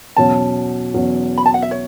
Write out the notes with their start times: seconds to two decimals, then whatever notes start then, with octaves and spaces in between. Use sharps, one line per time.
0.16 E2 B2 F#3 C#4 A5
0.94 E2 B2 F#3 C#4
1.38 B5
1.46 A5
1.54 F#5
1.62 E5
1.71 C#5